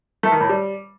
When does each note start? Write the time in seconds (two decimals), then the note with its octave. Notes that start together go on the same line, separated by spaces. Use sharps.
0.23 A3
0.32 D#3
0.41 A2
0.49 G3